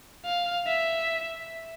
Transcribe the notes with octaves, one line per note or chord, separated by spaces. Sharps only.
F5
E5